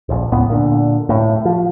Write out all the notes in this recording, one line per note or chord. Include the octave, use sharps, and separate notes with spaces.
D#1 A#1
C#2 A2 B3
A#2 D3
A2
F3